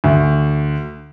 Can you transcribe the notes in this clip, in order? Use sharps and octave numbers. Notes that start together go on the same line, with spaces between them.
D2